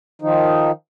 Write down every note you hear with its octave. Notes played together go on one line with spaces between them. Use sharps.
D#3 F3 D#4